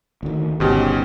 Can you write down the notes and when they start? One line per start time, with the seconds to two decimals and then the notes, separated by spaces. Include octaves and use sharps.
0.23 D2 D#3
0.60 G1 C#2 G#2 B2 C#4 G4